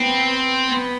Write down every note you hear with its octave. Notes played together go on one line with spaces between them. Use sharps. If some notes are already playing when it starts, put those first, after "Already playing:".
Already playing: B3 C4
B3